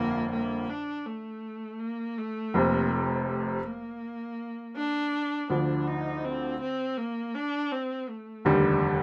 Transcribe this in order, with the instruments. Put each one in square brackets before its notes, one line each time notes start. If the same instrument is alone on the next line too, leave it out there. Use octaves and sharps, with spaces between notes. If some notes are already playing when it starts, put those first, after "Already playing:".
Already playing: [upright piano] G1 F2 D3 [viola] A#3
[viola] A#3
D4
A3
A#3
A3
[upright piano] F1 F2 C3 [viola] A#3
[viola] A3
A3
A#3
D4
[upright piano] D2 D3 F3 [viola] D4
[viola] D#4
C4
C4
A#3
D4
C4
A3
[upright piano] F1 D#2 D3 G3